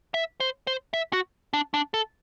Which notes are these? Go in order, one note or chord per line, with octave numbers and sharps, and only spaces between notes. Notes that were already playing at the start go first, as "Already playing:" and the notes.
E5
C5
C5
E5
F#4
D4
D4
A4